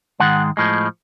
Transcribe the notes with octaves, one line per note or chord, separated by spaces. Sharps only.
G#2 D#3 G#3 F#5
A2 F3 G#3